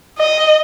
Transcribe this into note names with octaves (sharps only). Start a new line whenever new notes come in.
D#5